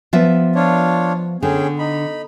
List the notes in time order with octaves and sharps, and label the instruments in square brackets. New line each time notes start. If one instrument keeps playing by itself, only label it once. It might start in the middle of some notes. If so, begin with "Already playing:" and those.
[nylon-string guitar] F3 B3 E5
[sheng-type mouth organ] D4 F4 C#5
[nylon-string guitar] D3 [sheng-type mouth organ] C#4 G#4 G5
[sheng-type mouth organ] D#4 B5